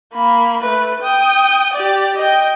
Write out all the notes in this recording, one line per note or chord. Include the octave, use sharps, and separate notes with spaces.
A#3 B5
A3 B4
G5 D#6
G4 D5
D#5 G5